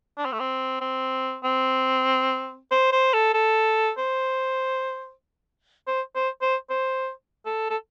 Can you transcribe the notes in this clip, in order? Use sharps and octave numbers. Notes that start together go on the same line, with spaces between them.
D4
C4
A3
C4
C4
C4
C5
C5
A4
A4
C5
C5
C5
C5
C5
A4
A4